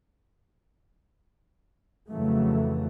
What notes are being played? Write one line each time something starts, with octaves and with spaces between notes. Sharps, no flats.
F2 C#3 E3 F#3 A3